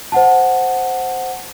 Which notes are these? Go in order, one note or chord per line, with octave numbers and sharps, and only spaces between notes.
C5 F#5 A5